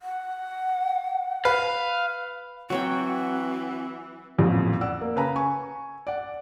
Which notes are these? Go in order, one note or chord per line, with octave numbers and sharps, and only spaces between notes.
F#5
B4 F5
E3 F#3 C4 F#4 C#5 G5
A1 F2 A#2
D5 F#5 E6
A#3
C#3 B4 A#5
G#5 C#6
D5 F#5